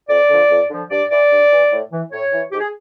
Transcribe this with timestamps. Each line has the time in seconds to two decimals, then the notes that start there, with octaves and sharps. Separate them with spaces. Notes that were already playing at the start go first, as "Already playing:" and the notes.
0.09 F2 D5
0.29 D3 F3
0.50 F2
0.70 D3 F3
0.91 G2 D5
1.11 E3 D5
1.31 G2
1.52 E3
1.72 A2
1.92 E3
2.12 A2 C#5
2.33 E3
2.52 G#2 G4
2.60 G#4